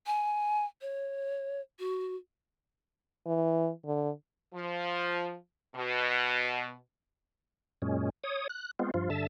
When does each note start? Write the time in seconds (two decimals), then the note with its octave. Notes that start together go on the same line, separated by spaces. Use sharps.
0.06 G#5
0.81 C#5
1.79 F#4
3.26 E3
3.86 D3
4.54 F3
5.75 B2
7.82 F#2 A#2 G#3 C#4
8.24 C#5 D#6
8.49 F#6
8.79 G#3 B3 C4 F4
8.94 G2 F3 F4
9.10 G2 D3 E5 A5